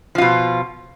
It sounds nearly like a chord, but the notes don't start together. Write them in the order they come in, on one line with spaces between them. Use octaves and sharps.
F3 F4 B2